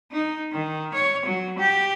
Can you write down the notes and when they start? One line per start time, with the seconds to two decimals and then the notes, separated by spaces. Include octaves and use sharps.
0.12 D#4
0.52 D#3
0.94 C#5
1.26 F#3
1.58 G4